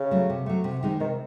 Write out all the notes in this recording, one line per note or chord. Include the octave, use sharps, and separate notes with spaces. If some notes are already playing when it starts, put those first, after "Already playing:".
Already playing: C#3
F#3 A3
C3
F#3 A3
C3
D#3 G#3 D#4
C3 D#3